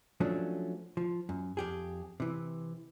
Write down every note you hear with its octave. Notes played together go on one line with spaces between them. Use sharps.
F3 F#3 A3 C#4 D4
F3
F#2
F2 G4 G#4
C3 E3